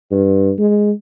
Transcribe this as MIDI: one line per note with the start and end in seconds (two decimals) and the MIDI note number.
0.11 0.51 43
0.59 0.92 56